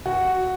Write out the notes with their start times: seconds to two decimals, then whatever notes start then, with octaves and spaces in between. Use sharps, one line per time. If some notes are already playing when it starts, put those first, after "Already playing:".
0.06 F#4